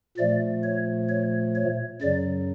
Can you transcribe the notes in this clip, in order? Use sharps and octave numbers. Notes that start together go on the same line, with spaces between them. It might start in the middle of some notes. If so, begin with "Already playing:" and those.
A#2 F3 A3 D5
C#5
C#5
C#5
F#2 C#3 F#3 D5